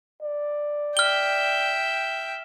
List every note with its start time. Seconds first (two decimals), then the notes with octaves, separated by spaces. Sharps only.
0.23 D5
0.97 E5 G5 F6 G7